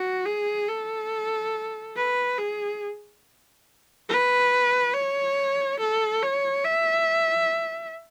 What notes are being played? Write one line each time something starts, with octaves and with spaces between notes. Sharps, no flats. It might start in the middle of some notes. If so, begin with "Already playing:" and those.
Already playing: F#4
G#4
A4
B4
G#4
B4
C#5
A4
C#5
E5